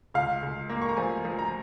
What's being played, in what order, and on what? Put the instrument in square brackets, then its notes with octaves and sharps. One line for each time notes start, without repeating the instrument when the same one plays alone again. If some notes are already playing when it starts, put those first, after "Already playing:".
[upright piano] C#2 F5
C#2
A#3
C#6
A#5
F3 G#5
F3
A#5